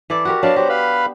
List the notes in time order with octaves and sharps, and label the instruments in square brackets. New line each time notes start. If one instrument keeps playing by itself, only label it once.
[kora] E3 A4 D5
F#4 G4 A#4
[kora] F#3 B3 D4 [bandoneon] F5 A5
[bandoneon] F#4 C5 [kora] G4
[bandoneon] B4 F5 B5